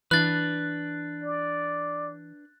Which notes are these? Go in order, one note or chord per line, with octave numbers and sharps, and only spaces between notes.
E3 D4 B4 F#6 A6
D5